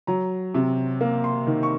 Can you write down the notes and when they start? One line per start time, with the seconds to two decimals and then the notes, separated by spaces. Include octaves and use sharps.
0.07 F#3 A#5
0.54 C3
1.01 A#3
1.24 C6
1.47 D#3
1.63 C#6